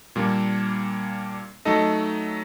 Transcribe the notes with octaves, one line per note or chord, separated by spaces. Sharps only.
A#2 G3 A#3 D4
F#3 A3 D#4 A4 D#5